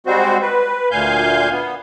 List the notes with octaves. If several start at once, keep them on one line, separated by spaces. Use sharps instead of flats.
G3 G#3 C4 F#4 C5
B4
D2 A#2 F5 G#5 G6
B3